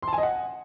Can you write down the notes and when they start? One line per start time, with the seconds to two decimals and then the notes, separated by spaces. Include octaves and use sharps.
0.02 C6
0.08 A5
0.13 G#5
0.18 D#5
0.23 F#5